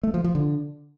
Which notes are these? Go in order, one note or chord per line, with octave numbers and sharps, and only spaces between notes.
A3
F3
F3
D3